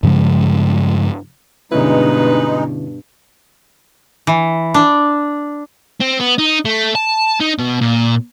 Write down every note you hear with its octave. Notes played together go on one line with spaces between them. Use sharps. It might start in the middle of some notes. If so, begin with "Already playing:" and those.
G2 C#3 F3 G#3
G2 B2 D3 G#3 C#4 D#4 E4 B4
E3
D4
C4
B3
D#4
A3
A5
D#4
B2
A#2